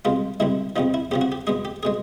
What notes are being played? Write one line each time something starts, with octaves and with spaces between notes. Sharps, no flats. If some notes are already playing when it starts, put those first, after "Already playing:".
C2 B2 G#3 F4
C2 B2 G#3 E4
E2 C3 F3 D#4
E4
E2 C3 F3 G4
F#4
G4
E2 B2 G#3 G#4
G4
B2 G#3 G#4